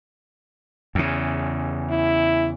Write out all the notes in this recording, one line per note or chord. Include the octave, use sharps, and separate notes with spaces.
E2 C#3
E4